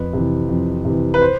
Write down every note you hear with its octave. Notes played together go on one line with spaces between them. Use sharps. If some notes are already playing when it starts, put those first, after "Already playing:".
Already playing: F2 B4
C3 E3
F2
C3 E3
B4
C5